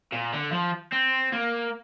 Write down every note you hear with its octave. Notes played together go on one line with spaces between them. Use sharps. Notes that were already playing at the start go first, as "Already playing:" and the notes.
A#2
D3
F3
C4
A#3